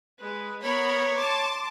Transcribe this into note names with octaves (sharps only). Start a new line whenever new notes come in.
G#3 B4
B3 A#4 C#5 B5
A5 C6 D6